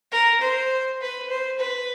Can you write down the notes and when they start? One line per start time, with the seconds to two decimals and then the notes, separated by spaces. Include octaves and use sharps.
0.12 A#4
0.41 C5
1.01 B4
1.30 C5
1.59 B4